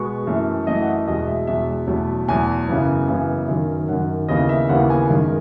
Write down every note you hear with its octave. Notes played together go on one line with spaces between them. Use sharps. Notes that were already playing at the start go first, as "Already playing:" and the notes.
Already playing: B2 G#3 B3 C#6
F#2 E3 A3
F#2 E3 A3 D#5
F#5
E5
E2 B2 G#3 D#5
E5
E2 B2 G#3 E5
E2 B2 F#3 A3
E2 B2 F#3 A3 G#5
F#2 C#3 E3 B3
F#2 C#3 E3 B3 G#5
F#2 D#3 F#3
F#2 D#3 F#3 F#5
D#2 C#3 E3 B3 D#5
E5
D#2 C#3 E3 B3 F#5
G#5
F#2 D#3 G#3